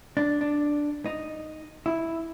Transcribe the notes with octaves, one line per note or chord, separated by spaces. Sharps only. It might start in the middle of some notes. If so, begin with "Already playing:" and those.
D4
D4
D#4
E4